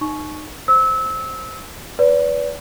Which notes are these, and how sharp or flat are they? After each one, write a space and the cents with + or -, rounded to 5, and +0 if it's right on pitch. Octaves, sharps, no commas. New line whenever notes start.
D#4 -25 C#6 +0
C5 +0 E6 -25
B4 +0 D5 -35